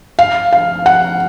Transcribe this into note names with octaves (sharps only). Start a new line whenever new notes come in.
F5
F5
F#5